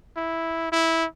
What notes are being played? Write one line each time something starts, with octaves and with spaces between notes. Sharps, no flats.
E4
E4